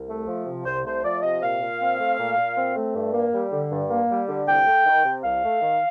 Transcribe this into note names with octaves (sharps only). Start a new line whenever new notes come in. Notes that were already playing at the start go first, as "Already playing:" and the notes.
Already playing: C2
A3
F3
C3
C2 C5
A3 C5
F3 D5
C3 D#5
A#2 F5
A#2
C4
A3
A#2
A#2
C4
A3
G2
A#3
G3
D3
G2
A#3
G3
D3
C2 G5
A3
D#3
C3
C2 F5
A3
D#3